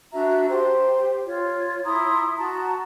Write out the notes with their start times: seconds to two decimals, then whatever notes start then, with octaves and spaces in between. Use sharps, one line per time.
0.13 D4 F#4 E5 A#5
0.49 G4 C5
1.25 F4 C#5
1.85 E4 A#5 C6 D#6
2.38 F#4 A5 A#5